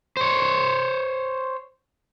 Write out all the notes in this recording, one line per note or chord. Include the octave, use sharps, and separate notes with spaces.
C5 C#5